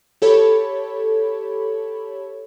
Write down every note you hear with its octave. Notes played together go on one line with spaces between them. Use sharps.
G4 A4 C#5 B5